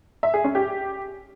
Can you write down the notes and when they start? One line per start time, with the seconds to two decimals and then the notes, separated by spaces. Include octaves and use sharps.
0.23 E5
0.34 G#4
0.44 C#4
0.55 G4